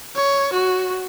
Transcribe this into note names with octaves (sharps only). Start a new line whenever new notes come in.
C#5
F#4